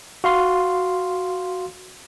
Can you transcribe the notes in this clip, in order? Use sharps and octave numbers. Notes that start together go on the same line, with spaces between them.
F#4 F5 C6